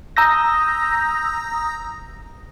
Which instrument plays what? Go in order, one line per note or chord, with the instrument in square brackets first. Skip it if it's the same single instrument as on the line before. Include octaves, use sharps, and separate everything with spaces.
[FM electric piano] A#5 D#6 E6 G6 A#6